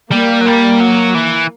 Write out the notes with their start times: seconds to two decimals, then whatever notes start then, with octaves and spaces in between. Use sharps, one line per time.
0.11 G3 A#3
0.41 F#3
0.46 G3
0.80 F#3
1.14 E3